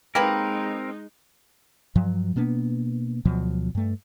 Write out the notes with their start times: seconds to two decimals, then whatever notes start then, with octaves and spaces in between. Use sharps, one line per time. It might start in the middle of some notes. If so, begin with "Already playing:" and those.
0.15 G#3 A#3 C4 D#4 G4 A#4 B4
1.95 G2 F3 F#3
2.36 B2 A#3 B3 D4
3.25 D2 B2 F3 F#3
3.75 G2 A3